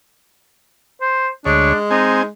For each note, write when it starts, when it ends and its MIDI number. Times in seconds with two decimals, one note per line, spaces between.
1.01 1.28 72
1.45 1.73 38
1.45 2.29 56
1.45 1.75 62
1.45 1.73 73
1.90 2.23 60
1.90 2.21 63
1.90 2.23 80